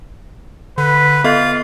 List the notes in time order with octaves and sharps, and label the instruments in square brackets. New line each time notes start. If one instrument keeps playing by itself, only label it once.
[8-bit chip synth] D3 [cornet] B4
[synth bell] B3 A4 D#5 [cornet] F4 [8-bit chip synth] F5